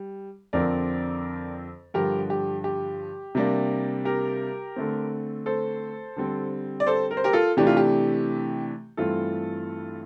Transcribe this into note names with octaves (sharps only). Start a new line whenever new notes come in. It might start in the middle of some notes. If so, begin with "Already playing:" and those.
Already playing: G3
F2 D3 F3 C4 A#4 D5
G2 D3 F3 G4 A#4
G4
G4
C3 G3 A#3 D4
G4 A#4
D3 A3 C4
A4 C5
D3 G3 C4
D5
A4 C5
A#4
C5
G4 A#4
F4 A4
C3 E3 A3 D4 G4
F4
G4
G2 E3 A3 C4 F4 A4